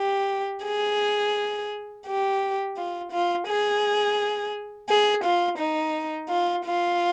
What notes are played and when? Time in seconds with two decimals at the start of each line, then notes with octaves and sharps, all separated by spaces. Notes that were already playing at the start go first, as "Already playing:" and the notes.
Already playing: G4
0.64 G#4
2.06 G4
2.77 F4
3.12 F4
3.48 G#4
4.88 G#4
5.24 F4
5.59 D#4
6.30 F4
6.65 F4